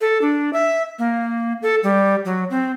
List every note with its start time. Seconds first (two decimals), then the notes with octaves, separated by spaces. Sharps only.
0.01 A4
0.22 D4
0.53 E5
0.99 A#3
1.62 A4
1.83 G3
2.25 F#3
2.50 C4